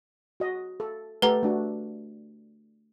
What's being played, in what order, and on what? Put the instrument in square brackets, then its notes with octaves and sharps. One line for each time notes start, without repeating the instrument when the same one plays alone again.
[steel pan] F#4 D#5
A4
[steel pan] A3 G4 A4 [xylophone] B4 F#5 A#5
[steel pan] A3 D4 F#4